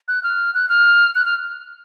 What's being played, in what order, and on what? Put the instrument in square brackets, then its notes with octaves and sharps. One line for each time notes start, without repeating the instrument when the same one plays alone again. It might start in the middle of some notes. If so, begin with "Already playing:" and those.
[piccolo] F#6
F6
F#6
F6
F#6
F6